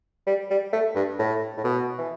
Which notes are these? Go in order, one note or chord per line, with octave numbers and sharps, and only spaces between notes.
G3
G3
A3
G2
A2
A2
B2
E3